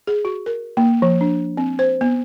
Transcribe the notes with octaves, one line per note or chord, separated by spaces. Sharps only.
G#4
F#4
A#4
A#3
F3
D4
C4
C5
B3